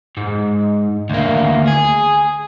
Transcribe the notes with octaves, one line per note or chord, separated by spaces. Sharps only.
G#2
D2 A#3
G#4